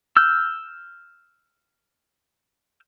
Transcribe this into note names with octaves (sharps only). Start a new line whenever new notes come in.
E6 F6 G6